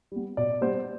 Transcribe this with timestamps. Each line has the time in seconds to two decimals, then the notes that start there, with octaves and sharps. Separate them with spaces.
0.12 G3 B3
0.37 B2 D5
0.61 G3 B3 C5